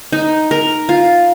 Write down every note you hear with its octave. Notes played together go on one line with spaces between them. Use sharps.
D#4
A#4
F4